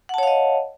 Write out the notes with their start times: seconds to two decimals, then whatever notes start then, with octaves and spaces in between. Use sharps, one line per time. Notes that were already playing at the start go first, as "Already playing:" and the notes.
0.09 F#5
0.14 A5
0.18 C#5
0.23 F5
0.27 D#5